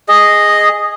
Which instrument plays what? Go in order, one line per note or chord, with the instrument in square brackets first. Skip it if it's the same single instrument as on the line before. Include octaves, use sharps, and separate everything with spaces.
[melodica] G#4 D#5